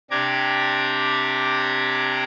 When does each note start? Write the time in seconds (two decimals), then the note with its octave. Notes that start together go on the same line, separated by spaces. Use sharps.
0.11 C3 D4 G4 A#5 D6 G#6